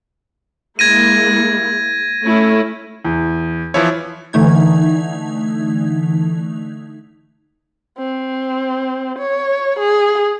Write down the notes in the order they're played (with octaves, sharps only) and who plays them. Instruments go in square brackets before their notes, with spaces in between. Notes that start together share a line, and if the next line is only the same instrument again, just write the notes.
[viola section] G#3 A#3 E4 [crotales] G#6 A#6 D#7
[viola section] A3 C#4 E4
[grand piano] E2
[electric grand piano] E3 F3 C#5 [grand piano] E4
[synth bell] D3 E3 A3 D#4 G#6
[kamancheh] C4
C#5
G#4